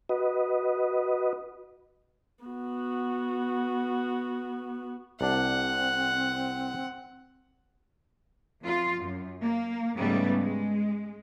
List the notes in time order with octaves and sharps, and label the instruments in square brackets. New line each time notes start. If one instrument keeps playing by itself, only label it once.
[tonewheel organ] F#4 B4 D#5
[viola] B3 F#4
[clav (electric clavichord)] C2 D4 [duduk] C4 [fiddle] F#5
[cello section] F2 F4
F#2
A#3
G#2 C#3 G3 A3 B3
G#3